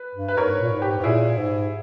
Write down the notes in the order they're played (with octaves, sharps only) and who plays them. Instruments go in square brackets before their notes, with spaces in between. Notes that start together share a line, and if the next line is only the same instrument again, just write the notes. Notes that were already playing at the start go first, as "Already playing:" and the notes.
Already playing: [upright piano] B4
[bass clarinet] G2
[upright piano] B4
[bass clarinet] G#2 [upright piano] A#4 C#5
[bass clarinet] A#2
G#2
[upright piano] G4
[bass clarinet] G#2
[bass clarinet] A#2 [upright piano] E4 G#4
[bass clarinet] G#2